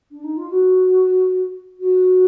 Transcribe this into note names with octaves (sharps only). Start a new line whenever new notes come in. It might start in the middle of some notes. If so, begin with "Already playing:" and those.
D4
D#4
F4
F#4
F#4